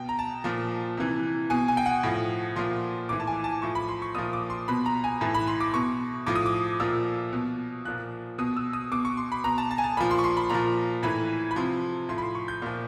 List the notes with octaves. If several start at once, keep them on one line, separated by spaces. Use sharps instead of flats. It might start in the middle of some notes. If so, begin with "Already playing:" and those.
Already playing: B2 G5
A#5
A5
A#2 F3
C3 E3
B2 G#5
G#5
G5
F#5
A2 F3
A#2 F3 C6
A2 E3 D6
A5
G#5
A5
A2 F3 C#6
B5
C6
C#6
A#2 F3 D#6
D6
C6
B2 B5
A#5
G#5
A2 E3 A5
B5
C6
D6
B2 C#6
A2 F3 D6
D#6
D6
A#2 F3 E6
B2
A#2 F3 F#6
B2 D#6
E6
D#6
B2 D6
C#6
C6
B5
B2 A#5
A5
A5
G#5
A5
A#2 F3 B5
C6
C#6
C6
B5
A#2 F3 A#5
A2 E3 B5
B5
C3 F3 C6
A2 F3 C6
B5
C6
C#6
G6
A#2 F3